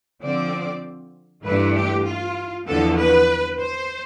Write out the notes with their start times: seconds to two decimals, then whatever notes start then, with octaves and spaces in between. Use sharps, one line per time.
0.22 D3 F3 C4 D5
1.45 G2 E3 A3 D4 B4
1.75 G4
2.05 F4
2.66 E2 D3 F3 B3 A4
2.97 B4
3.59 C5